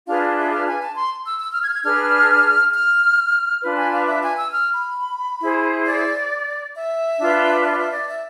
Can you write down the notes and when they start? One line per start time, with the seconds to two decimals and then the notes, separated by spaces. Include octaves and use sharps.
0.07 D4 F4 G#4 B4 F5
0.21 D5
0.36 E5
0.51 F5
0.66 G#5
0.81 A5
0.96 C6
1.25 E6
1.40 E6
1.51 F6
1.63 G#6
1.68 F6
1.73 G#6
1.85 D4 G#4 B4 F6
2.74 F6
3.63 D4 F4 B4
3.78 G#5
3.92 F5
4.07 E5
4.22 G#5
4.37 E6
4.51 F6
4.74 B5
5.41 E4 G#4 C5
5.86 D5
6.75 E5
7.19 D4 F4 B4
7.63 E5
7.72 D5
7.79 E5
7.93 D5
8.08 E5